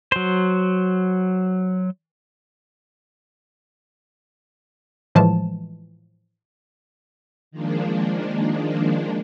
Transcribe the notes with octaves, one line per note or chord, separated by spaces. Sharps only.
F#3 C5
A2 E3 F3 G#3 A5
D#3 F3 G#3 A#3 D4